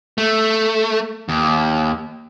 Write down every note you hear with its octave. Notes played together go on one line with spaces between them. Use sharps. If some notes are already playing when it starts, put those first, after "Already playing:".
A3
D#2